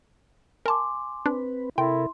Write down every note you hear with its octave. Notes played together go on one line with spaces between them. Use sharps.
A#4 G#5 A5 C6 D6
C4 D4 B4
C3 E4 A4 A#4 G5 C6